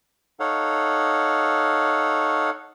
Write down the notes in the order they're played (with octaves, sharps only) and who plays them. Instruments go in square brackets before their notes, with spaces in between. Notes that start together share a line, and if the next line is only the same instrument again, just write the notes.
[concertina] D#4 A4 C#5 F5 F#5